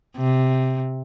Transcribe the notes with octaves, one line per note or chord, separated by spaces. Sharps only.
C3